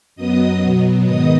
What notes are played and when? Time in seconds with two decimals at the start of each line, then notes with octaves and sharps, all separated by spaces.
0.16 F#2 F#3 B3 D#5 D#6
0.60 B2 F#3 B3
1.04 G#2 D#3 B3 D#5 D#6